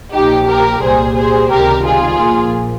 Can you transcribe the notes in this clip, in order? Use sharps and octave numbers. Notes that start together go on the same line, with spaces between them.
A#1 A#2 F3 D#4 G4
G4 A#4
C2 A#2 G3 G#4 C5
G#4 C5
C#2 C3 D#3 G3 G4 A#4
F4 G#4
A#1 A#2 F3 A#3